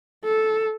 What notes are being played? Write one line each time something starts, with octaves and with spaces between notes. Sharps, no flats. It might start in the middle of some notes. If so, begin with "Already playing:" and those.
A4